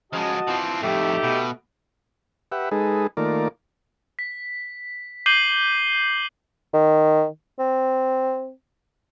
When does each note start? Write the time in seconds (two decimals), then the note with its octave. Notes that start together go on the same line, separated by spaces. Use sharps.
0.13 C#3 F3 G#3 F#4 D#5 A5
0.48 E3 F3 C4
0.83 F2 A2 A3 D#4 G4
1.24 B2
2.52 G4 B4 E5 F#5
2.71 G#3 D#4 G#4 A4 B4
3.17 D#3 A3 A#3 F4 A#4 D5
4.19 B6
5.26 D6 G6 C7 D#7 F#7 G7
6.73 D#3
7.59 C4